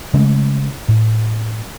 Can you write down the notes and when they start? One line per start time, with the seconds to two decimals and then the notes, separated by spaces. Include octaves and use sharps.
0.14 C#3 G#3 A3 C#4
0.88 A2